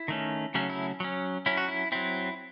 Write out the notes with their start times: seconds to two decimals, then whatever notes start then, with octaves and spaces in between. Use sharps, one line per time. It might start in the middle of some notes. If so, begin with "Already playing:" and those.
Already playing: E4
0.08 D#3 A3 C#4
0.54 C#3 F#3 A3 C#4
0.70 E4
1.00 F#3 C#4
1.46 F#3 C#4 E4
1.57 F#4
1.68 E4
1.92 F#3 C4 E4